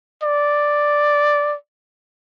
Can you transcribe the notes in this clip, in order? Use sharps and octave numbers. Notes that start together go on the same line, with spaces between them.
D5